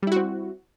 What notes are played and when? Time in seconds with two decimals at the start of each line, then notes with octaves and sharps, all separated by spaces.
0.02 G3
0.07 E4
0.12 F#4
0.16 C4